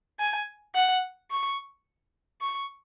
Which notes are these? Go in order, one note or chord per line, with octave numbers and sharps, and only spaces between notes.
G#5
F#5
C#6
C#6